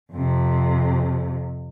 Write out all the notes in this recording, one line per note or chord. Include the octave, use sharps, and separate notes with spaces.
F2 C3